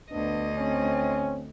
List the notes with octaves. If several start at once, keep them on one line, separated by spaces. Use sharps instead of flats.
D2 B3 D4 D#5
C4 C#4